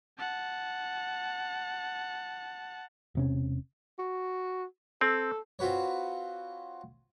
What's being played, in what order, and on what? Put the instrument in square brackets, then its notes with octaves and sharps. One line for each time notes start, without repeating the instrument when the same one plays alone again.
[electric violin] F#5 A5
[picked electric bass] E1 C3 C#4
[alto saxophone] F#4
[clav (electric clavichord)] C4 [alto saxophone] A4
[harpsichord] C4 F4 F#4 B4 C#5